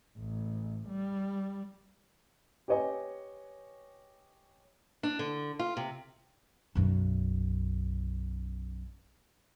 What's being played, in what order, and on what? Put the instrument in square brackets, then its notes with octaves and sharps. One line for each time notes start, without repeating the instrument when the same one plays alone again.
[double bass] A1
G3
[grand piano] G4 B4 C#5 D#5 G#5
[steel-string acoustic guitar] D4
D3
F4
C3
[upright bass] B1 F#2